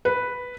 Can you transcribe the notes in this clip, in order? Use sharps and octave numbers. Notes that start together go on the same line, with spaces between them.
B4